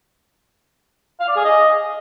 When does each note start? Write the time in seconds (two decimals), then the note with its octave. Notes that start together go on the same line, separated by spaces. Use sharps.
1.20 F5
1.28 D5
1.36 G#4
1.44 D#5